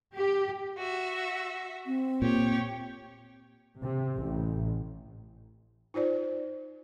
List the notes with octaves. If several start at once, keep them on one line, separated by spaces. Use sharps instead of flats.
G4
F#4 E5
C4
A#2 G4 C#5
C3
A1
D#4 F4 C5 D5